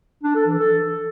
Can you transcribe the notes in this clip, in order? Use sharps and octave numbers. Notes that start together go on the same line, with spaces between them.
D4
A4
E3
A4